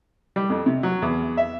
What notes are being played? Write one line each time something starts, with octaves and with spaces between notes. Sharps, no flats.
G3
F2
C3
F#3
E2
E5